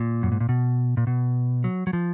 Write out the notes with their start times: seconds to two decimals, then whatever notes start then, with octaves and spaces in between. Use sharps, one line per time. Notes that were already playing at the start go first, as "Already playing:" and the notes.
Already playing: A#2
0.23 F#2
0.32 G#2
0.41 A#2
0.49 B2
0.97 A#2
1.07 B2
1.64 F#3
1.87 F#3
1.93 F3